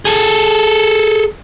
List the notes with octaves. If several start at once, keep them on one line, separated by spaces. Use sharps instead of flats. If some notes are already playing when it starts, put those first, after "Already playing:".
G#4 A4